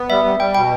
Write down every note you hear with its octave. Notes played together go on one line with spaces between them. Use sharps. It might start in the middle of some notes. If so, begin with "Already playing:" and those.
Already playing: B3
G3 E5
G3
G3 G5
B2 G5